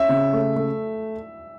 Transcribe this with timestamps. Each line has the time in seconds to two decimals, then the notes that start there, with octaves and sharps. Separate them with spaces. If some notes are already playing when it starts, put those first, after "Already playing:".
Already playing: C#4 E5
0.09 C#3
0.33 A3
0.56 A3